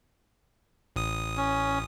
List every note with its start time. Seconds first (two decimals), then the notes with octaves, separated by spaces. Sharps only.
0.96 A1 D#6
1.37 C#4